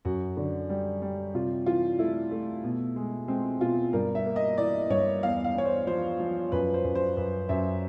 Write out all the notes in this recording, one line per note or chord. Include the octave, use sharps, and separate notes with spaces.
F#2 F#4
D3
G3
G3
C3 F4
E3 F4
A3 E4
A3
B2
G#3
G#3 C4
B2 F4
G2 A#4
E5
A#3
D#5
E3 D5
G2 C#5
E2 F5
F5
E2 C#5
C5
F3 C5
F3
F#2 B4
C5
F#2
C5
F#2 B4
F#2 E5